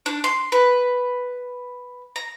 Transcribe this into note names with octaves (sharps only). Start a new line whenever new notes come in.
D4
C6
B4
A#5